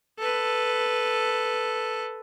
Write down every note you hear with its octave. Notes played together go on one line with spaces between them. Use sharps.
A4 B4